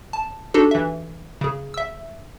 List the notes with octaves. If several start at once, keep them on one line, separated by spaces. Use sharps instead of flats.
A5
D4 D#4 F#4 G4 A4
E3 E5
C#3 G#4
E5 E6